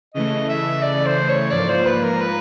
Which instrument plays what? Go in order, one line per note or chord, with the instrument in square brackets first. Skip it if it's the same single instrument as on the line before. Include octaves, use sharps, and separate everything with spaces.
[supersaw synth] C#3 E3 A3 [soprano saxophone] D#5
[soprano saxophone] E5
D5
C5
C#5
[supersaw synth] G#2 F3 A#3 [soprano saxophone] D5
[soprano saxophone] C5
B4
A#4
B4